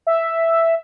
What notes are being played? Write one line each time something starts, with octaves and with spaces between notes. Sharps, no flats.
E5